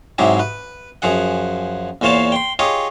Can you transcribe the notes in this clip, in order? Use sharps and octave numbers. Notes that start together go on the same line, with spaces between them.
G#2 C3 F#3 E4 G4 G#4
B4
F#2 F3 G#4 F#5
E2 A#2 C5 C#5 F5 A5
G5 C6
F4 G4 G#4 C#5 D#5